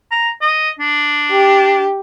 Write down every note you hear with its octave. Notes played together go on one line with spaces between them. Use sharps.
A#5
D#5
D4
G4